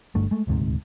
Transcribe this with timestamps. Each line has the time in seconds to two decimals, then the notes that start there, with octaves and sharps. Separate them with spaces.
0.15 G1 G2 D3 A3
0.31 G#3 A3
0.47 D#1 D2 G#2 C3